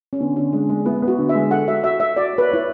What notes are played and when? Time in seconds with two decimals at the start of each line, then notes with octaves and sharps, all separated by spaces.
0.13 C#4
0.20 D3 B3
0.36 D3 C#4
0.53 G#3 D4
0.69 G#3 D4
0.86 B3 E4
1.02 B3
1.08 F#4
1.18 D3
1.29 E5
1.35 G#3
1.51 A4 F#5
1.67 F#4 E5
1.84 F#4 E5
2.00 F#4 E5
2.16 F#4 D5
2.33 B4 C#5
2.49 E4 C#5